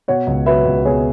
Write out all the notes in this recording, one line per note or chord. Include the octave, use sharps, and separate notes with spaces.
B2 C#5 F#5
C#2
F#3 B4 E5
C#2
B2 G#4 C#5